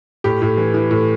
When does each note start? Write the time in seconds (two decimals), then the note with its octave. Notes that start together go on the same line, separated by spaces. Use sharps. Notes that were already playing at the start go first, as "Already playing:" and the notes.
0.24 A2 G4
0.42 A2
0.57 E3
0.74 E3
0.91 A2